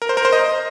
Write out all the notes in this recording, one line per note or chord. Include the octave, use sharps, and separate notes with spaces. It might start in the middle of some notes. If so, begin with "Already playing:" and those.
A#4
C5
A#4
C5
D#5